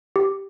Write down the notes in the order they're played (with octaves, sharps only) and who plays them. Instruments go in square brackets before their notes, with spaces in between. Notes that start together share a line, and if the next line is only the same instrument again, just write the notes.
[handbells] G4